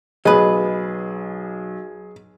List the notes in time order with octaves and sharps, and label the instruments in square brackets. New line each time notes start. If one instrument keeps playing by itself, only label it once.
[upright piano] B1 [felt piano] G#4 [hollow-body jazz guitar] B4 D#5